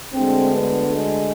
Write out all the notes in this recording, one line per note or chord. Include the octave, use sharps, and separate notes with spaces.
D2 D3 G#3 C4
B3
G#3